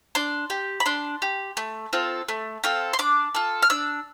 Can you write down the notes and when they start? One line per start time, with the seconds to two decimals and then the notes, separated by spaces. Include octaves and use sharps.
0.15 D4 C6
0.50 G4
0.80 B5
0.86 D4 C6
1.22 G4
1.57 A3
1.93 C4 F4 A4
2.29 A3
2.64 C4 F4 A4
2.93 C6
2.99 D4 D6
3.35 F4 A4
3.62 F6
3.70 D4 E6